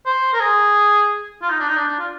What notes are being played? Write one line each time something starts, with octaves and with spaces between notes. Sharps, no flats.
C5
A#4
G#4
F4
D#4
D4
D#4
D4
D4
F4